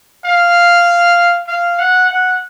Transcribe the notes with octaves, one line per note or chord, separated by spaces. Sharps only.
F5
F5
F#5
F#5